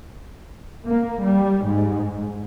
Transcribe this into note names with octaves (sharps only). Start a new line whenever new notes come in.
A#3
G3
G#2